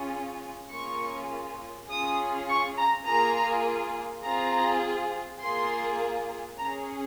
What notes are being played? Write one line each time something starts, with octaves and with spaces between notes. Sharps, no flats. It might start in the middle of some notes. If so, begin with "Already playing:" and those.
Already playing: C#4 F4 G#4
A#3 C#4 F4 G#4 C#6
C#4 F4 G#4 D#6
C#6
A#5
A#3 F4 G#4 A#5
C4 F4 G#4 A#5
A#3 F4 G#4 C6
C#4 G#4 A#5